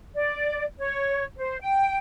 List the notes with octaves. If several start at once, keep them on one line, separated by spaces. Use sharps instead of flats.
D5
C#5
C5
G5